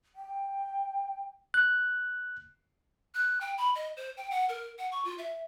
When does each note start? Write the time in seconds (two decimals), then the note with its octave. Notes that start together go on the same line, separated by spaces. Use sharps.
0.15 G5
1.54 F#6
3.14 F#6
3.41 G5
3.58 B5
3.75 D#5
3.97 C5
4.17 G5
4.31 F#5
4.49 A#4
4.78 F#5
4.92 C#6
5.05 F4
5.18 E5